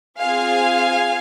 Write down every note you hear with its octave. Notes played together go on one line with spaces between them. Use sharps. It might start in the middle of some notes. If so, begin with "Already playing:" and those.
C4 F4 G#4 F5 G#5